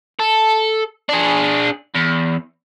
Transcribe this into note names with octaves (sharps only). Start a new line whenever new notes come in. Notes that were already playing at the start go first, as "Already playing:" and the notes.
A4
D4 G#4
E2